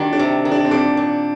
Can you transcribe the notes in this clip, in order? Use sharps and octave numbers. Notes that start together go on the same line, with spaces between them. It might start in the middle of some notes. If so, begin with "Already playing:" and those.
Already playing: D#3 G3 A#3 D4 F#4
D4
C3
D#3
D4
C4
A#2 D4
A#2